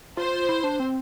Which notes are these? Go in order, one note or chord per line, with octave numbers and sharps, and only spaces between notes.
F4 C5
E4
D4
C4